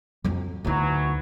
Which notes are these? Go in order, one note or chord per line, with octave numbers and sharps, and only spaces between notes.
F2 F#3
D2 E3 F#3 D#4